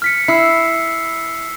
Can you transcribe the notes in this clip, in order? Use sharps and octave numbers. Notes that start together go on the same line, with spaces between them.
F6 B6 C#7
E4 E6 C7